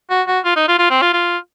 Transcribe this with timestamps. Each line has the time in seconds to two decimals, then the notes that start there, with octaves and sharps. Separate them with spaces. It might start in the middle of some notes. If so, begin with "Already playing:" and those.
0.10 F#4
0.27 F#4
0.45 F4
0.56 D#4
0.68 F4
0.78 F4
0.90 C4
1.02 F4
1.13 F4